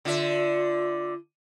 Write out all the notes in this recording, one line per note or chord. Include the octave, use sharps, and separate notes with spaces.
D3 F4 E5